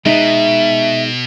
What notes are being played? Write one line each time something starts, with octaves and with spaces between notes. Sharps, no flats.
B2 G#3 D#4 E5